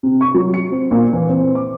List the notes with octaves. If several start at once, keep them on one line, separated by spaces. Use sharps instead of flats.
C3
C#6
F#3
C#7
C4
A#2
E3
C4
D6